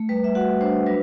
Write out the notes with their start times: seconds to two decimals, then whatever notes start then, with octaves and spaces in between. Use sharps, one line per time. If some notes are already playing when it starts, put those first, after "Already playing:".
Already playing: A3
0.09 G3 B4
0.24 E5
0.35 F#4 F#5
0.61 D4 C5
0.86 F#3 B4